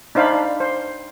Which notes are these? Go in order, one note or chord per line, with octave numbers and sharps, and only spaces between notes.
D4 D#4 C5 F5 B5
C5